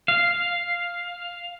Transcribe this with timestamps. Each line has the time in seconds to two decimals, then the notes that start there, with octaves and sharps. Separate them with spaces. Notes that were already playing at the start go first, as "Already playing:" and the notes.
0.08 F5